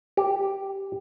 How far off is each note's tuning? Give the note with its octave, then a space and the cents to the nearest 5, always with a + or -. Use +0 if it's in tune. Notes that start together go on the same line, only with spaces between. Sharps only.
G4 -5